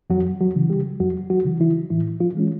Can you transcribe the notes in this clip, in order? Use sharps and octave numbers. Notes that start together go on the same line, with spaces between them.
F2 F#3 F#4
F#3 F#4
C#3 E3
G3 G4
F2 F#3 F#4
F#3 F#4
C#3 E3
E3 E4
A2 E3 E4
F3 F4
E3 G#3 C#4